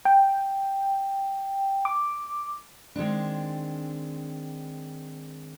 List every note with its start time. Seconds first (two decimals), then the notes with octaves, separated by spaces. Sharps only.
0.05 G5
1.85 D6
2.96 D#3 G#3 C4 D4